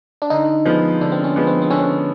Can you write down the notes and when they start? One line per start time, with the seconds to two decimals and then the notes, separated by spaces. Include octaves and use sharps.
0.22 D4
0.30 D3 D#4
0.65 F3 G#3 B3
1.01 D3 D4
1.12 C4
1.24 C#4
1.36 F3 G#3 B3
1.47 C4
1.62 C4
1.70 D3 C#4